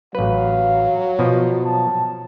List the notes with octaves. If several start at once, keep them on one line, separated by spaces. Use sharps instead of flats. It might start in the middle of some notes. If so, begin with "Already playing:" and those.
A1 F#3 B4 F5
B2 F3
A5